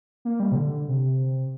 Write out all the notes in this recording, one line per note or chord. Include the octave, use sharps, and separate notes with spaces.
A#3
G3
C3
D3
C3